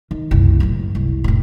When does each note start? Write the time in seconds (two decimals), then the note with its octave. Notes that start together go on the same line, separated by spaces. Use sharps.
0.11 D#3
0.31 F#1 C2
0.60 F#2 A2
0.95 C2
1.24 F1 A2